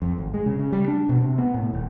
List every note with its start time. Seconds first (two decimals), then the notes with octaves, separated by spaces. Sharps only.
0.02 F2
0.18 G#1
0.34 G#3
0.46 C#3
0.59 C#3
0.72 G3
0.88 D4
1.09 B2
1.22 C3
1.38 B3
1.54 A2
1.74 D#1